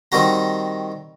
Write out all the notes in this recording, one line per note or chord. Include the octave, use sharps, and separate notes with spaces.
D#3 G3 C4 F#4 A#5